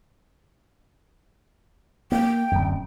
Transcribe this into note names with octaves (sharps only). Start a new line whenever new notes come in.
A#3 G5
D1 F#2